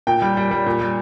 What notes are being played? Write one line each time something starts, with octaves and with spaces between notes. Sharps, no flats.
A#2 G5
G3
G3
G3
A#2
G3